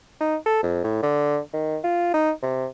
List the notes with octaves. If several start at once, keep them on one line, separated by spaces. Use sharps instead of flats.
D#4
A4
F2
A2
D3
D#3
F4
D#4
C3